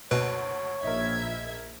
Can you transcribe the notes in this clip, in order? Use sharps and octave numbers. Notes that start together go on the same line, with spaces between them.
F#1 D2 B2 B4 C#5 D7
A#1 D#4 A#4 E5 G#6